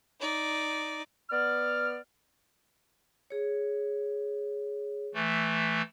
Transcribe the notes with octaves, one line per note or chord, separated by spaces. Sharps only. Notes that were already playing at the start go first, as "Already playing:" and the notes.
D#4 D5
B3 D5 F6
G#4 C#5
E3 A3